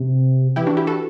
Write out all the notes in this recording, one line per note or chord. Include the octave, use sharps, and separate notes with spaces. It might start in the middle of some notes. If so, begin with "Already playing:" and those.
Already playing: C3
E3 E4 G4
D4 F#4
E4 G4
F#4 A4